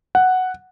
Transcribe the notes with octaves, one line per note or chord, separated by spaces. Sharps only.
F#5